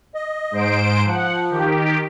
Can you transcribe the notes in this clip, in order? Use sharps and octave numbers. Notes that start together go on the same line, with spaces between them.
D#5
G#2 C5 D7
F3 F#5
D#3 G4